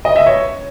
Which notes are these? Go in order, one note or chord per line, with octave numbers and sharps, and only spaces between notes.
D#5
E5
C#5